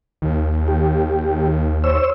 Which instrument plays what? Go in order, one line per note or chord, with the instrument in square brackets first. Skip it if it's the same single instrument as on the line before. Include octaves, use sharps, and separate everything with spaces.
[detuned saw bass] D#2
[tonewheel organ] G4
C5 C#5 E6